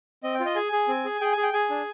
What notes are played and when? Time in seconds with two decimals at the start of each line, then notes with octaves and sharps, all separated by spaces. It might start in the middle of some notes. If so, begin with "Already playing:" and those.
0.23 C4 D#5
0.34 G5
0.40 F4
0.45 D#5
0.56 G#4 G#5
0.72 G#4
0.88 C4
1.05 G#4
1.21 G#4 G5
1.32 G#5
1.37 G#4
1.43 G5
1.53 G#4 G#5
1.70 D4